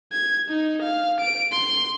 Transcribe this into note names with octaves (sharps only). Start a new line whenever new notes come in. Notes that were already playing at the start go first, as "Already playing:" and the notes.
G#6
D#4
F5
D7
C6